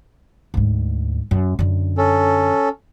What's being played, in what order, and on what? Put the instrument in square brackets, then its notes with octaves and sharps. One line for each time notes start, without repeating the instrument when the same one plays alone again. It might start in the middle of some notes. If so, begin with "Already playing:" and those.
[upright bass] D2 G#2
F#2
F#2 D3
[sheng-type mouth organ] C#4 A4